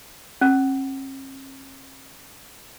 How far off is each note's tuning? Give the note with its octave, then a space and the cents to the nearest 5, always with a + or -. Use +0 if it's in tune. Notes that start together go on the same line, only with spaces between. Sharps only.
C#4 -45